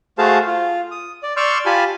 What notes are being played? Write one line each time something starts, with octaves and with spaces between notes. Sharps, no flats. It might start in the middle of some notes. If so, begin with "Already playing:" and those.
A3 F#4 G#4 C5 F5 A5
F4
D#6
D5
D5 C6 C#6 E6 F6 G6
F4 G4 G#5 A5 B5